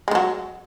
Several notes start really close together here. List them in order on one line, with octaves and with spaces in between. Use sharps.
G#3 D#3 F#3